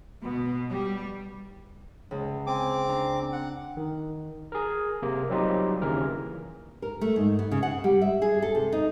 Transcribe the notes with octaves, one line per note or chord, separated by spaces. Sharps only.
B2
G3
C#2 G#3
C4 G#5 D6
D4 A#5 C7
F#5
D#3
G#4 A#4
C3 A#3
F#3 G3 C4 D#4 F4 G4
D#2 C#3 E3 A#4
A#4
A3
G#2
B3
C#3
F#5
G3
E5
G#4
A4
C3
D#4